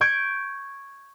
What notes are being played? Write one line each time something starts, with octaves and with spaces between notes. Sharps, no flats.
C#6 G6 G#6 D7